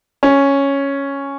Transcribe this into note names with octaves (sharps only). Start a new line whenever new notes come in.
C#4